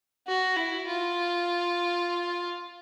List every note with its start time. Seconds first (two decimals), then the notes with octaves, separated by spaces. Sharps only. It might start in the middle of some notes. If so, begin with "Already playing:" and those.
0.27 F#4
0.57 E4
0.87 F4